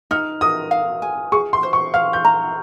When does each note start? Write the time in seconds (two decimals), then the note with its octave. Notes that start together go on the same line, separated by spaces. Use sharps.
0.11 D#4 F6
0.41 A#4 D#6
0.71 F5
1.02 G#5
1.32 G#4 C#6
1.53 C6
1.63 C5
1.73 C#6
1.94 F5 F6
2.13 G6
2.25 A#5